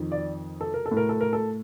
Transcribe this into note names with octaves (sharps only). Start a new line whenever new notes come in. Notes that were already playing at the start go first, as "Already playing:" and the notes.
Already playing: F2 D#3
D5
A4
A#4
A4
A2
A#4
A4
A#4
A4